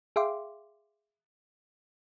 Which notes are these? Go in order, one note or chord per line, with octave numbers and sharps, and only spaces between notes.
G#4 E5 F5 G5 C6 D6